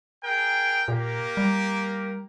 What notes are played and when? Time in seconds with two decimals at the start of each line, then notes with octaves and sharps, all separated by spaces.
0.22 G#4 A#4 G5
0.88 A#2 A#3 G4 A#4
1.37 G3